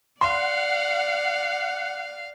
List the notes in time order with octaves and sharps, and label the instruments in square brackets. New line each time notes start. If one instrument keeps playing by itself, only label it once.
[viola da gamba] D5 [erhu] F5 [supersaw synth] F#5 [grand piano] C6